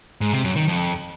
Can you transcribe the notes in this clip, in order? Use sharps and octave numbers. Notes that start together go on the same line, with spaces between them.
G#2
C3
F#2
D#3
F2